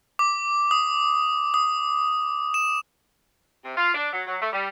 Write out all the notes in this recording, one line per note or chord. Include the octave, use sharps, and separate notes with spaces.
D6
D#6
D#6
E7
C3
F4
D4
F#3
F#3
A3
G3